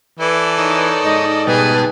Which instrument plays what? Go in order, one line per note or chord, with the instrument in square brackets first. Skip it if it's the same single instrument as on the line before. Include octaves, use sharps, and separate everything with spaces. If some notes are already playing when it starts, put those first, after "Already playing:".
[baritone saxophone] E3 [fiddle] A4 D5
[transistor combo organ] D#4 A#4 C#5
[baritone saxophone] G#2 [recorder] D#5
[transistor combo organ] B2 G3 A5 [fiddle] G#4 [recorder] B4